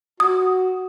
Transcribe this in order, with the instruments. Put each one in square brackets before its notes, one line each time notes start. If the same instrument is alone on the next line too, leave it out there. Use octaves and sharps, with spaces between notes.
[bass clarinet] F#4 [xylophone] D#6